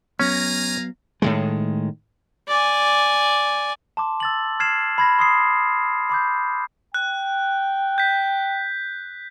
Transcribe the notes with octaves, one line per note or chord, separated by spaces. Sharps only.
F#3 B3 C#4 F5 G#5 A#5
A2 D#3 G#3
D5 G#5
A5 C6 D6
E6 A6 F#7
F6 G#6 C7 E7
B5 G#6 A#6
C6 D#6 C7
B5 D6 G6
G5 F#6
G6 B6